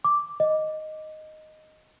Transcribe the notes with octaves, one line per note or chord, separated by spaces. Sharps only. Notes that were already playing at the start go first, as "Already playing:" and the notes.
D6
D#5